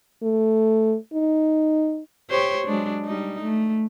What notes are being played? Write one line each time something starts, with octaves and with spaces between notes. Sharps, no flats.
A3
D#4
G4 C5 C#5
F#3 G#3 D4
G3 D#4
A3